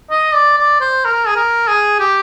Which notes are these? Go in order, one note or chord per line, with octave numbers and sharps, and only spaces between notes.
D#5
D5
D5
C5
A#4
G#4
A#4
G#4
G4